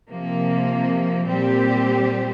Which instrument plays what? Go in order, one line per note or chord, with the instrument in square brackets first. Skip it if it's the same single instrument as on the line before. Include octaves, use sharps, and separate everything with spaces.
[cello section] C3 F3 A#3
A#2 G3 C4 G4